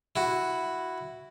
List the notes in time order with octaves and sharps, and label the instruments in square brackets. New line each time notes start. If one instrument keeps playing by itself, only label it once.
[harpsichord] E4 F#4